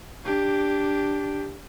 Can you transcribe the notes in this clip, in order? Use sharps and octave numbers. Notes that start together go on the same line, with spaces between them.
D4 G4